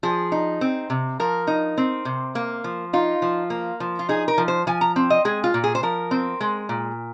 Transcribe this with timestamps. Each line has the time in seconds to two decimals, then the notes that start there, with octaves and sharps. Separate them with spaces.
0.03 F3 G#4
0.32 D#4
0.61 C4
0.90 C3
1.20 F3 A#4
1.47 D#4
1.78 C4
2.05 C3
2.35 A#3
2.64 F3
2.93 D#4 F4
3.22 F3
3.50 A#3
3.80 F3
3.99 F4
4.09 D#4 G#4
4.28 A#4
4.38 F3
4.48 C5
4.67 F3 G#5
4.81 A#5
4.96 C4
5.10 D#5
5.25 G#3 G#4
5.44 F4
5.54 A#2
5.64 G#4
5.75 C5
5.83 F3 A#4
6.11 C4
6.41 G#3
6.69 A#2